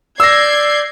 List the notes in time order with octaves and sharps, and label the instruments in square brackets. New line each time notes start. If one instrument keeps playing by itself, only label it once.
[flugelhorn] D5 [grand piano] E6 A#6 [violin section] G6 G#6 C7